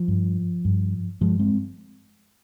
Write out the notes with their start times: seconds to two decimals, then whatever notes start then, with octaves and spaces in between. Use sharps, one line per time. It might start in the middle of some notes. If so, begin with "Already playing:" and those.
Already playing: F3
0.08 G2
0.65 G2
1.21 G2 F3 G#3
1.39 G#3 C4